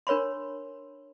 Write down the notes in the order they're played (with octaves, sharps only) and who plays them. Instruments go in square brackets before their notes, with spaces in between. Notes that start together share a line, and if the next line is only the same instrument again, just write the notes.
[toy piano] D4 A#4 C#5 B5 C6